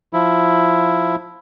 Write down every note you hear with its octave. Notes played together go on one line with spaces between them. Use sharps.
F3 E4